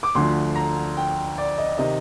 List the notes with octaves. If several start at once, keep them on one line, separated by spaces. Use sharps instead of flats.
D6
D2 D3 F3 C6
A#5
G5
D5
D#5
C3 D#3 D#5